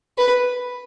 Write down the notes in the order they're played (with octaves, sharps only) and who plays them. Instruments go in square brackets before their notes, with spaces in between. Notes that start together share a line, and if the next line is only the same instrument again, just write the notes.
[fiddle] B4